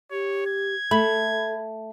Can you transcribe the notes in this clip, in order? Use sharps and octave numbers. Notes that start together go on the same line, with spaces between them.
G4 C#5
G#6
A3 A4 B5